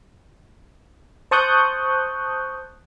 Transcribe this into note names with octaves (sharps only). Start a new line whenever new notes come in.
C5 A5 C#6 D#6 F#6 G6